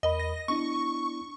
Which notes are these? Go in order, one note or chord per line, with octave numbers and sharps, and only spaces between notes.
E2 A#4 D#5 B5
A#6
B3 D4 E4 C#6